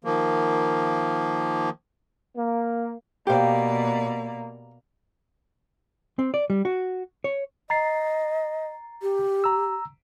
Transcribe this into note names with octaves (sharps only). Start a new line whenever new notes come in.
D#3 F3 A#3
A#3
B2 A#3 G4 C5 D5 F5
C4
D5
G3
F#4
C#5
D#5 A#5 A6 C7
G4
A#5 E6